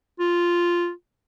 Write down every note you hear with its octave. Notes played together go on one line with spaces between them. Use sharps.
F4